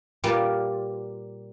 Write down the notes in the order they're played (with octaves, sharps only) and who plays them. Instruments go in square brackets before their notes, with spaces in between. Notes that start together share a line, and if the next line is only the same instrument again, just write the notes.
[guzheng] A#2 G3 A#3 F4 A#4 B4